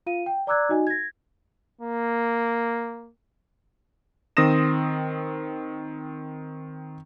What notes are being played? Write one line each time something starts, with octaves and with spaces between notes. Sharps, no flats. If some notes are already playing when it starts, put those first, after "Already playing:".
F4 F5 D#7
G5
D5 A#5 D6 E6 F#6 G#6
D#4 F#4 D#5 G#5
G#6 A#6
A#3
D#3 C4 C6 D#6 A#6 E7